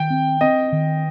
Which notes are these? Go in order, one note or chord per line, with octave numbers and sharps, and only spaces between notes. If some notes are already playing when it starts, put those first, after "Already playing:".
Already playing: D#3 G5
C4
C4 D#5
D#3